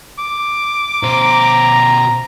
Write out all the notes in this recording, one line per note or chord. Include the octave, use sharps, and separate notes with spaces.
D6
B2 C5 A#5